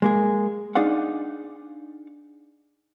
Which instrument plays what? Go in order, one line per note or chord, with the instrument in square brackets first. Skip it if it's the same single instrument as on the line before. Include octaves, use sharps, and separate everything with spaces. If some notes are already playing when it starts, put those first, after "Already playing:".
[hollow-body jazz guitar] G#3 A#3 G#4
D4 D#4 G#4 D5 F5 F#5